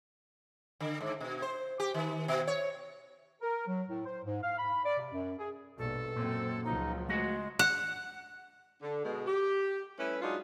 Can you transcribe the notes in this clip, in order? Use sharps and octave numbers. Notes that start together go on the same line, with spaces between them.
D3
G#2
B2
C5
G4
D#3
B2
C#5
A#4
F#3
A2
C5
G#2
F5
B5
D5
C3
F#2
G#4
A#1 G2 B2 A4
F#2 A#2 C4
C#2 F3 F#3 D#4
G#3 A3 F#4 F#5
F#5
D3
B2 G#3
G4
G3 A3 C#4 E4 B4
F#3 G#3 D4 D#4 F4 F#4